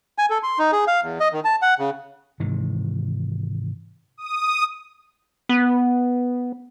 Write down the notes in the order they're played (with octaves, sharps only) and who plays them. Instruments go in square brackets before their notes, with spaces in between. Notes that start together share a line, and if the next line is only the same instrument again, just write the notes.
[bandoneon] G#5
A4
C6
D#4
G#4
F5
E2
D#5
D#3
A5
F#5
C#3
[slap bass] G#2 C3 D#3 E3
[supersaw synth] D#6
[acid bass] B3